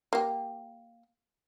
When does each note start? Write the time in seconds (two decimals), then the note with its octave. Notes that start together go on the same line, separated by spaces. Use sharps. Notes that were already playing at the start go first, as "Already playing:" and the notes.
0.13 A#3 G4